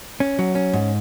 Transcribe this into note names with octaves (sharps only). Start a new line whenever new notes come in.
C#4
F#3
C#4
G#2